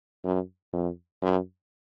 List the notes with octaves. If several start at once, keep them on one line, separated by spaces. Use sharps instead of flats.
F#2
F2
F#2